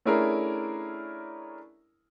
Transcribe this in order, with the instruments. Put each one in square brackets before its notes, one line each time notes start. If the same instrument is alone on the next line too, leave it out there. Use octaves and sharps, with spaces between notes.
[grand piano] A3 C#4 D4 E4 G#4 A#4